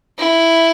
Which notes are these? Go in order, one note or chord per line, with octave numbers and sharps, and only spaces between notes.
E4